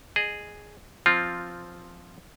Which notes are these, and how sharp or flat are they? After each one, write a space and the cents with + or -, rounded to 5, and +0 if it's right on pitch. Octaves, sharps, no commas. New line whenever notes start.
G#4 +0 D#5 -30
F3 +0 C4 +0 F4 +0